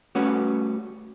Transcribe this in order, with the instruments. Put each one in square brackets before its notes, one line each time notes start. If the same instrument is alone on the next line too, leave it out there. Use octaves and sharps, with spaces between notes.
[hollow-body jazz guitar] G3 A3 C#4 F#4 B4 C#5